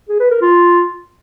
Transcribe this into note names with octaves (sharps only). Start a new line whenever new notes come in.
G#4
B4
A#4
F4